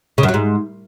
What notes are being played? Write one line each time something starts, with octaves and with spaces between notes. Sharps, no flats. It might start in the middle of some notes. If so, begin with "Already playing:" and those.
C#3
F#2
F#3
G#2